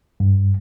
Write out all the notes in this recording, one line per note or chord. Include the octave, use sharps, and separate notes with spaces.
G2